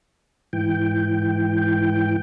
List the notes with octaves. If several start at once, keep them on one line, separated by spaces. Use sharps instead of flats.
G#2 E3 G5